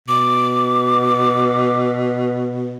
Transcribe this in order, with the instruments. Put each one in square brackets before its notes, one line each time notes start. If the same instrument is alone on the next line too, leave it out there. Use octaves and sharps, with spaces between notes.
[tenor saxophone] B2 [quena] D6